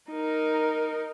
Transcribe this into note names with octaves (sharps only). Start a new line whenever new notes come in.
D#4 A#4